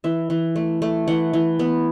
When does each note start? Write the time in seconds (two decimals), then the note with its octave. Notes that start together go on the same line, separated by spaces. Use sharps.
0.04 E3 E5
0.30 E3
0.56 A3
0.82 A3
1.08 E3 F#5
1.33 E3
1.59 B3